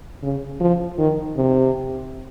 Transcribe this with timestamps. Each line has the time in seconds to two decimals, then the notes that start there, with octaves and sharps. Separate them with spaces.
0.23 C#3
0.60 F3
0.98 D#3
1.37 C3